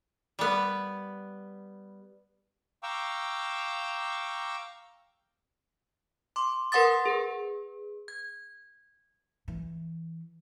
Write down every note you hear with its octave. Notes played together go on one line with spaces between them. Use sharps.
G3 B3
F5 G5 A#5 C#6 D6 E6
C6 D6
A#4 B4 F#5 C6 D#6 A6
G#4 B4
G#6
E3